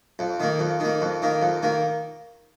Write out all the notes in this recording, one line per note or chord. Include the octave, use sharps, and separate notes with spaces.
F2
D#3 A#3
F2
D#3 A#3
F2
D#3 A#3
F2
D#3 A#3